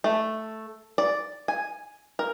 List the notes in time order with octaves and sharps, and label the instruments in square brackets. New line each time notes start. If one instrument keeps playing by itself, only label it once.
[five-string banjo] A3
D5
G#5
A#4